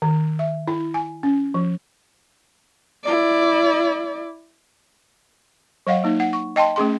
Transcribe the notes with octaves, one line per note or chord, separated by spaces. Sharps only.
D#3
E5
E4
G#5
C#4
F3
E4 D5
F#3 D#5 F5 F#5
A#3 D#4
F#5
C#6
D#5 G5 A5 C6
A3 C#4 G#4 C6